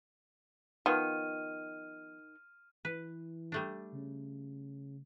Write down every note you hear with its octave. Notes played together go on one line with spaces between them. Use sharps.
D#3 F3 B3 F4 F6 D#7
E3 B4
G3 A3 D4
C#3